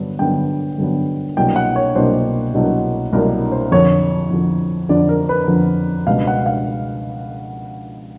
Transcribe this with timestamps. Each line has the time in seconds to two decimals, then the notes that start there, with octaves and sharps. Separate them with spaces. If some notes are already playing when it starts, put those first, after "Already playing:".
Already playing: G2 D3 F#3 B3 D4
0.19 G2 D3 F#3 B3 D4 G5
0.78 G2 D3 F#3 B3 D4
1.37 C2 B2 F#3 A#3 D4 G5
1.56 F#5
1.76 C#5
1.95 C2 B2 F#3 A#3 D4 C5
2.54 C2 B2 F#3 A#3 D4
3.13 C2 B2 F#3 A#3 D4 A#4
3.52 C5
3.72 F2 D3 F3 C#5
4.30 F2 D3 F3
4.89 F2 D3 F3 D5
5.09 A#4
5.29 B4
5.48 F2 D3 F3
6.07 C#2 B2 G3 B3 D4 F5
6.27 F#5
6.46 F5